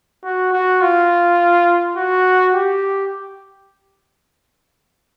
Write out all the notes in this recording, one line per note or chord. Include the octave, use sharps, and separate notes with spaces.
F#4
F#4
F4
F#4
G4